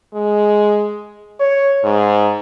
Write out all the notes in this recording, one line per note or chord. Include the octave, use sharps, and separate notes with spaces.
G#3
C#5
G#2